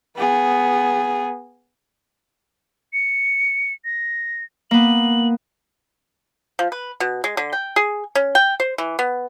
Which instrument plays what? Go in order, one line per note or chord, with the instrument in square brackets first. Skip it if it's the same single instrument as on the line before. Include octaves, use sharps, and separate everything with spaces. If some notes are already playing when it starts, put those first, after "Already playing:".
[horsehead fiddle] B3 G#4
[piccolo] C#7
A#6
[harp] A#3 B3 [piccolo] F#7
[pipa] F3
B4
B2
G#3
D3
G5
G#4
C#4
G5
C5
E3
B3